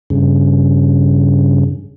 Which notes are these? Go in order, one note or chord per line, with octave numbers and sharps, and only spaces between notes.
G2 C#3